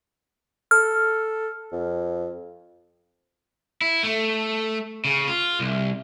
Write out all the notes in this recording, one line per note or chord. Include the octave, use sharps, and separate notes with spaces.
A4 F6
F2
E4
A3
C#3
F4
C2